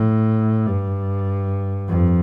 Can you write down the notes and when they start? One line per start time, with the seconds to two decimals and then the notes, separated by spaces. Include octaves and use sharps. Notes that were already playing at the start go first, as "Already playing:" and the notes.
Already playing: A2
0.67 G2
1.89 F2